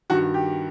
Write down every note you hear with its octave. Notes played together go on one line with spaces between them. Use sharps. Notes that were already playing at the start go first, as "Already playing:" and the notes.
G2 D#3 F#4
G4